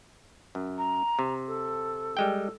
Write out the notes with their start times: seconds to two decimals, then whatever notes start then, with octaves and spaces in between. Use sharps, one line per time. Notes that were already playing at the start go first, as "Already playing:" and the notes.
0.55 F#2
0.78 A#5
1.19 C3
1.47 A4
2.17 G3 G#3 G5